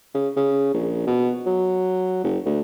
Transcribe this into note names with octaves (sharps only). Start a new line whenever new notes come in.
C#3
C#3
A#1
B2
F#3
F#1
D2